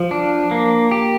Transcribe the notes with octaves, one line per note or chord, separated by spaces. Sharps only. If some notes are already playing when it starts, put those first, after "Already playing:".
Already playing: F3
D4
A#3
G4